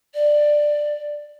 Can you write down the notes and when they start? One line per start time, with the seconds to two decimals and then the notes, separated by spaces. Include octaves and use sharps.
0.14 D5